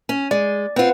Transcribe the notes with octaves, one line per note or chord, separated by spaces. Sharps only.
C#4
G#3 D5
C4 F4 B4 F#5